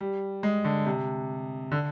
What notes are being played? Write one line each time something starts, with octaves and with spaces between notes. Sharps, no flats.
G3
G#3
D3
C3
D3